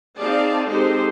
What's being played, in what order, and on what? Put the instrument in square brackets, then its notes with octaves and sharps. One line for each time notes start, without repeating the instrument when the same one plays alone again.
[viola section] C4 D#4 G#4 D5 F5 A5
G#3 C4 D#4 G4 A4 C5